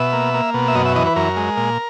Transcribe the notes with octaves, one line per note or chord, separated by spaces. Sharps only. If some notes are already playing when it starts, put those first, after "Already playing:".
Already playing: B2 E5
A#3
A#3
B2
E5
F#2 D#5
E5
E3 D#5
B4
F#2 A#4
G#3
A#2